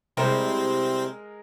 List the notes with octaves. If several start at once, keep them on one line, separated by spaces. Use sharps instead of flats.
C3 G3 G#3 C4 E4 A#4